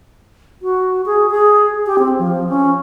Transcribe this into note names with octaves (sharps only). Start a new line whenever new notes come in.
F#4
G#4
G#4
G4
C4
F3
C#4